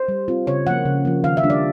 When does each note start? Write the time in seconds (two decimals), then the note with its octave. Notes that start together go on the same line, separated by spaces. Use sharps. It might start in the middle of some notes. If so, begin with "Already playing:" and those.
Already playing: C5
0.08 G3
0.28 C4 F4
0.47 C#3 C#5
0.66 F3 A#3 F#5
0.85 C#3
1.05 F3 A#3
1.24 D#3 F5
1.37 E5
1.43 G3 A#3 D4 F4
1.50 D5